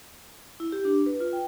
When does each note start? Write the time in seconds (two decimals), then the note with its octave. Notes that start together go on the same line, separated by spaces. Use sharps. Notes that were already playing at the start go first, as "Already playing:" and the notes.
0.60 E4
0.72 G4
0.85 D4
1.06 B4
1.20 F4
1.33 G5